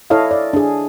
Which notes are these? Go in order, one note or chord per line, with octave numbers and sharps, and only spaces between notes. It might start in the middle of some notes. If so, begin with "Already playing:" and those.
E4 A4 C#5 D#5 F5
D5
D4 G#4